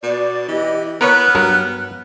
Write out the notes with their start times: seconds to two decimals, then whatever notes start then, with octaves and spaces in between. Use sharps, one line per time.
0.03 B2 D5
0.48 E3 G4 D#5
1.01 B3 A#4 B4 C#5 F6 F#6
1.35 G2 F#3 A#4